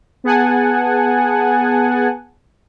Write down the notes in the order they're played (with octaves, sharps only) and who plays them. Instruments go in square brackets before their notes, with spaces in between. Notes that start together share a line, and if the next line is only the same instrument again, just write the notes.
[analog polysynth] B3 G#4 F#5 G#5 A5